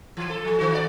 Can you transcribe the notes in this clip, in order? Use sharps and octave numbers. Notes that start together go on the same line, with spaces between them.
E3
A4
F3
D#3 F#4
D5